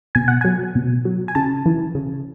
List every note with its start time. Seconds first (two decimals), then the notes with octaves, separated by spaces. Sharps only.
0.15 B2 G#5
0.28 F#5
0.41 F#3 G#5
0.75 B2
1.05 F#3
1.28 G#5
1.35 C#3 A5
1.66 E3
1.95 C#3